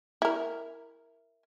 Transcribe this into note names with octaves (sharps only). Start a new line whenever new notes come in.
E4 A#4